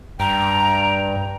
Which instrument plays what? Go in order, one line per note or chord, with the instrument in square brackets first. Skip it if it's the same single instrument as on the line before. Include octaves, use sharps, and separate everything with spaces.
[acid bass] G2 [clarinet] G5 [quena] A#5